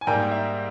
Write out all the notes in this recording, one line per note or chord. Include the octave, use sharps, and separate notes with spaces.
G#5
G#2 G3 A#3 G5
E5